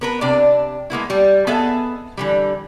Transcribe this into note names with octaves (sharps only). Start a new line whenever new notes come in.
B3 A#4 B4
C3 D4 D5
G#3 A#3 B3 E4
G3
B3 G#4 A4 D#5 E5
D3 E3 G3